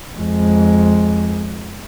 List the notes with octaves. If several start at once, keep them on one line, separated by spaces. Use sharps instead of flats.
F2 G#3